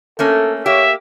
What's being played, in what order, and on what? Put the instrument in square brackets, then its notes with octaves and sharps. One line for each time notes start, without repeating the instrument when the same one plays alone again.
[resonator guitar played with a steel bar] A3 A#3 C#4 [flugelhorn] A4
[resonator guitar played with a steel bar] A#3 G4 [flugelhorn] C#5 [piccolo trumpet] E5